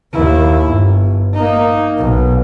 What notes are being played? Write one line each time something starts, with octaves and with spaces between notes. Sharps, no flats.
D#2 E4
G1
A#3 D#4
B1